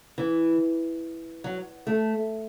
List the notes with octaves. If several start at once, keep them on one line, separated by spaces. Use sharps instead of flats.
E3
F#3
A3